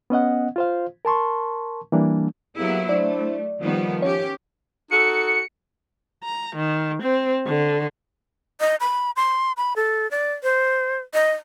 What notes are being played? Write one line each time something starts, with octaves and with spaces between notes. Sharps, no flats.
B3 C#4 D#5 F#5
F4 C5 F5
A#4 A5 C6 C#6
E3 G3 A#3 D4
F#3 A#3 B3 E4 G4 G#4
A3 D4 E4 C5 D5
D#3 F3 G3 B3
C#4 G4 C#5
D#4 F#4 A4 C#7
A#5
D#3
C4
D3
D#5
B5
C6
B5
A4
D5
C5
D#5